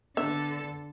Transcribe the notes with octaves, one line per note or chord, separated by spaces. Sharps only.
D3 B3 D4 A4 E5